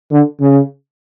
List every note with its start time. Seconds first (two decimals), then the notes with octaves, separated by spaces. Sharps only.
0.11 D3
0.40 C#3